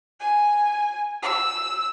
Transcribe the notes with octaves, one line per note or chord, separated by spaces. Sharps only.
G#5
E6